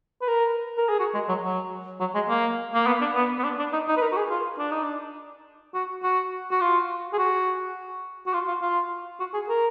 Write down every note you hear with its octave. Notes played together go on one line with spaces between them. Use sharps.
B4
A#4
A#4
G#4
F#4
G#3
F#3
F#3
F#3
G#3
A#3
A#3
B3
D4
B3
B3
D4
D4
D#4
D#4
B4
A#4
F#4
G#4
F4
D4
D#4
D4
F#4
F#4
F#4
F4
G#4
F#4
F#4
F4
F4
F4
F#4
G#4
A#4